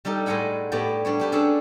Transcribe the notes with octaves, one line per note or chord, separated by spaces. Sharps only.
G3 D#4 G4 A4
A2 G#3 A4 F#5 G#5 B5
A2 B3 G4 D5
G3 D4 C#5
D4 G4 B4
C#4 D4 G#4 A4 F#5 A5